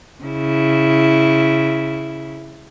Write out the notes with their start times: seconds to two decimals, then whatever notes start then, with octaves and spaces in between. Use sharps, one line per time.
0.24 C#3 E4